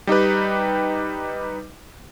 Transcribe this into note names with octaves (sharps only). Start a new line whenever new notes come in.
G3 D#4 G4 B4